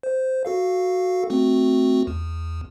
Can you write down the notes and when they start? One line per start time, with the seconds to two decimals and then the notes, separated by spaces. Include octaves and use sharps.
0.03 C5
0.45 F#4 A4 F5
1.30 A3 C4 F#4
2.07 E2